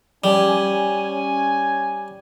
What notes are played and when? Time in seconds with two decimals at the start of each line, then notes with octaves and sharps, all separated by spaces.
0.24 G3 C#4 G#5